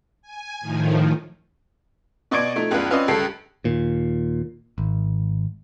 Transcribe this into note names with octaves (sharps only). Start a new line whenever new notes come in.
G#5
A2 D#3 F3
B2 D5 D#5 C#6 G#6 D7
F3 A3 D#4
F#1 C#2 B3 D4 F4 B4
C4 C#4 F4 B4 D5 D#5
C#2 G2 A4 C7
D#2 A#2
G#1